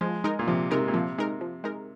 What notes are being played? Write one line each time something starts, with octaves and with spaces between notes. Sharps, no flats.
F3 G#3
G#3 D#4 A#4
A#2
C3 F3
C3 G#3 D#4 A#4
A#2
C3 F3
G#3 D#4 A#4
F3
G#3 D#4 A#4